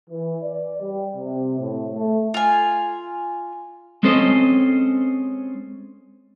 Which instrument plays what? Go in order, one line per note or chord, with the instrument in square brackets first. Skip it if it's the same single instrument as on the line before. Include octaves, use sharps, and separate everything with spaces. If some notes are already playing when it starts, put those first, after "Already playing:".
[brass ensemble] E3
D5
G3
C3
A2
A3
[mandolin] F4 G#5
[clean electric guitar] G#3 C4 C#4 A4 C5 D#5